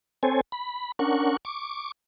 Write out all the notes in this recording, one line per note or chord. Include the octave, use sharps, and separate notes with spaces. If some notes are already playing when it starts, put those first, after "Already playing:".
C4 A4 C5 C#5 G#5
B5
C#4 D4 A#4 F#5 C#6
C#6 D6